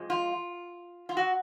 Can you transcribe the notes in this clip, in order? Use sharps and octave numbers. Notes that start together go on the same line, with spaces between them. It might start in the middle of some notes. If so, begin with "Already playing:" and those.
Already playing: F2 F3 G#3
F4
F4
F#4